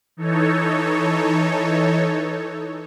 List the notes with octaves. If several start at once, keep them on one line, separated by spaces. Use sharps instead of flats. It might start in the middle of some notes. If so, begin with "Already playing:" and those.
E3 D#4 A4 C#5